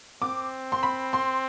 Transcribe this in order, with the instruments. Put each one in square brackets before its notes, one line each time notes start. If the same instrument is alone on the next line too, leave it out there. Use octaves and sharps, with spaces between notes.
[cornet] C4 [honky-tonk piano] D6
[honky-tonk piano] C6
B5
C6